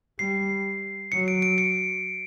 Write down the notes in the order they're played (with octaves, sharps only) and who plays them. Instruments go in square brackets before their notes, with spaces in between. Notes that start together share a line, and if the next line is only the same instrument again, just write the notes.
[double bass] G3 [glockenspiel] C7
[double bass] F#3 [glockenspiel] C#7
[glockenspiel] D7
D7
C#7